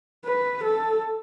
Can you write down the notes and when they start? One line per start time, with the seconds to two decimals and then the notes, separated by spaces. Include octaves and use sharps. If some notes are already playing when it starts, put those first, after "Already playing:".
0.25 B4
0.63 A4